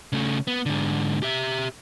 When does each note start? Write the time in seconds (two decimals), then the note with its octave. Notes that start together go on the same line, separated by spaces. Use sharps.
0.13 C#3 A3
0.47 B3
0.66 G#2 D3
1.23 G4 E5